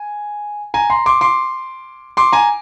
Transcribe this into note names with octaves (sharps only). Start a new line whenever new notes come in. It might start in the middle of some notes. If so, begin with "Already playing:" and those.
Already playing: G#5
G#5 A#5
A#5 C6
C6 D6
C6 D6
C6 D6
G#5 A#5